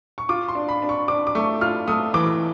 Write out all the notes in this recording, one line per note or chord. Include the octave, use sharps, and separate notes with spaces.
C#6
F4 D6
C6
D4
B5
D4
C#6
D4 D6
D6
A3 C#6
F4 F6
A3 D#6
E3 D6